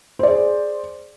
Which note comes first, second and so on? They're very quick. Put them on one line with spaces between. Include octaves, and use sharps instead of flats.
C5 D5 G#4